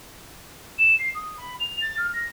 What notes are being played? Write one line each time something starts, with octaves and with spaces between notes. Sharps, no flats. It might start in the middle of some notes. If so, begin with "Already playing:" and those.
E7
C7
D#6
B5
F7
A6
F6
A#6